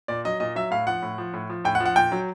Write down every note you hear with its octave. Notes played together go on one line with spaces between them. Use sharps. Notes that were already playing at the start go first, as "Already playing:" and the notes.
A#2 D5
F#3 D#5
A#2 D#5
F#3 E5
A2 F5
F3 F#5
A2
F3
A2
F3
A2 G5
F#5
F3
F#5
A#2 G5
F#3